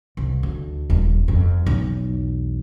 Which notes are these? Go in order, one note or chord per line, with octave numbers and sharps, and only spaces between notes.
C2
D2
D#1 D3
F2
B1 E2